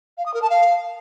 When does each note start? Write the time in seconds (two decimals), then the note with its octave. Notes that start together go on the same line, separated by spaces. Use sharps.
0.18 F5
0.26 D#6
0.34 A#4
0.42 A5
0.50 F5